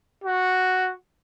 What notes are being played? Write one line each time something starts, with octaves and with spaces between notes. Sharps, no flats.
F#4